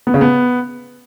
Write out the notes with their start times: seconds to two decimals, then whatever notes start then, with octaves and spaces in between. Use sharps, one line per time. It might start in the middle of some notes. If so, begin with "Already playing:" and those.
0.07 B3
0.14 C#3
0.21 B3